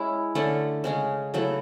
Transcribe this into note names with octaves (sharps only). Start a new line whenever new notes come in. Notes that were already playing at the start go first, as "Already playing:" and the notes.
Already playing: G#3 C#4 E4
D3 A3 C#4
C#3 G#3 C#4
C#3 F#3 A3 E4